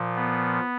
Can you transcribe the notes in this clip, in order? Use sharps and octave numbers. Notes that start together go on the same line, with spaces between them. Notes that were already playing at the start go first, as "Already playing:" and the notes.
Already playing: A#2 F3
B3